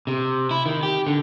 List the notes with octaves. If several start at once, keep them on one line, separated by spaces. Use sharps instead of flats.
C3
E4
D#3
G4
D3